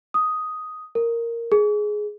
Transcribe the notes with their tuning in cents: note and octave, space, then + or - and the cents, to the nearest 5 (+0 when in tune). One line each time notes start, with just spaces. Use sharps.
D#6 +5
A#4 -5
G#4 +10